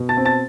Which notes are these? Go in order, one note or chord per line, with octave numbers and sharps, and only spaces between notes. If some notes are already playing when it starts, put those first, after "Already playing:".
Already playing: B2
A5 A6
C4
A5 A6